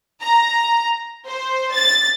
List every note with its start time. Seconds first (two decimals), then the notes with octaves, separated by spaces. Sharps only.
0.21 A#5
1.27 C5
1.72 A6